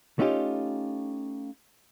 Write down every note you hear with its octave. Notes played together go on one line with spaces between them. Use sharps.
A3 C#4 D#4 F4 G4